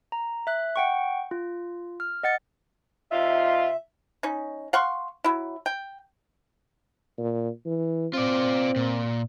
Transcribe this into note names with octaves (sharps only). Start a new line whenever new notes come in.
A#5
E5 F#6
F#5 G5 C#6
F4
F6
D#5 F#5 A6 C#7
C3 D#4 F4 E5
C#4 D#4
F5 F#5 C6 C#6
F#3 E4
G5
A#2
E3
C4 F4 D5
A#2